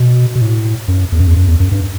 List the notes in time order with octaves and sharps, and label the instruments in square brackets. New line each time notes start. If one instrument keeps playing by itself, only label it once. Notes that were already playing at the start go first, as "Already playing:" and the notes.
Already playing: [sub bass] B2
B2
A2
F#2
E2
F#2
E2
F#2
E2
F#2
G2